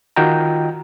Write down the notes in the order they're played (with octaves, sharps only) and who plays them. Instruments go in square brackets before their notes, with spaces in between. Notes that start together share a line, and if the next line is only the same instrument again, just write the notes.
[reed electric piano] D#3 F4 F#4 D#5 G5 A#5